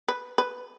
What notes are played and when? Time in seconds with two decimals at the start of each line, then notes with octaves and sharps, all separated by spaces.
0.08 B4
0.38 B4